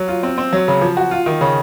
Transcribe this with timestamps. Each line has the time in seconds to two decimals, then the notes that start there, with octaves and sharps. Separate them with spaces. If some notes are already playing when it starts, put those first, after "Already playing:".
Already playing: F#3
0.08 F4
0.23 C4
0.38 C4
0.53 F#3
0.68 C#3
0.82 F3
0.97 F#4
1.11 F4
1.26 D#3
1.41 C#3